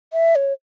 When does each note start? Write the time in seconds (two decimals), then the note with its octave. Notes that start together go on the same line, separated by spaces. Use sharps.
0.13 E5
0.35 C#5